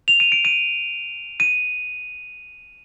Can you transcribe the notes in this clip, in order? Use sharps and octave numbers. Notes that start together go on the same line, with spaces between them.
F7
D#7
D7
D#7
D#7